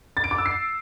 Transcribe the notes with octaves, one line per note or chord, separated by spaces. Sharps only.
A6
D7
D6
E6
C7